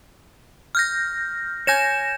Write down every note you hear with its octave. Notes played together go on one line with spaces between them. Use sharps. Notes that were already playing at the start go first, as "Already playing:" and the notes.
F6 G6 A#6
C#5 G#5 G6 A#6 E7